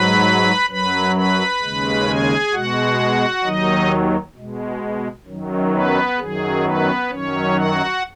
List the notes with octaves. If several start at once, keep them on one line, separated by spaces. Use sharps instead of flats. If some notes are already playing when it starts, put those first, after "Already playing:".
Already playing: G#2 F#3 B4 B5
F#2 F#3 B4 B5
B4 B5
D#2 C#3 G#3
G#4 G#5
B2 G#3 F#4 F#5
D#2 D#3 F#3 D#4 D#5
B2 G#3
F#2 D#3 F#3
B3 B4
F#2 D#3 F#3 G#4
B3 B4
F#2 D#3 F#3 C#4 C#5
F#4 F#5